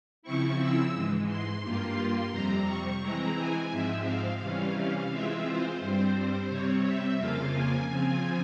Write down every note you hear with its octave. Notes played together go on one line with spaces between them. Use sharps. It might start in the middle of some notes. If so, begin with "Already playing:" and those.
C#3 F3 C4 E4 C#6
E6
G#2 E3 G#3
C6
G2 G3 A#3 F4
F2 C3 G3 C4 A#5
C#6
E3 G#3 C4 E4 A#5
G#5
G#2 F3 G#3 C4 E5
F5
C3 E3 G3 C#4
E3 G#3 C4 F4 E5
C5
G2 G3 C4 C5
C5
C3 G3 C4 C#5
E5
F2 C#3 F3 A#3 F4 F5
G#5
C#3 F3 C4 F4